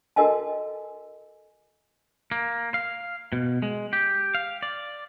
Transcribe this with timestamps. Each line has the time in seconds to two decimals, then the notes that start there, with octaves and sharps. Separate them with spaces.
0.16 F#4 A4 A#4 D#5 G#5 A5
2.32 A#3
2.74 F5
3.33 B2
3.62 G#3
3.93 G4
4.35 F5
4.63 D5